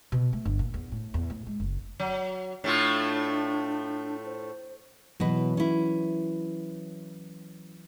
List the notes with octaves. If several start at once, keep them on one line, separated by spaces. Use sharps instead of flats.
B2
A3
G1
A#2
E2
A2
E2
A2
G#3
F#1
F#3
A2 A3 D4 F4
C5
B2 E3 F#3 B4
C#4 E4